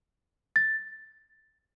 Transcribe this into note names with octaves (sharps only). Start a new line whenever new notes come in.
A6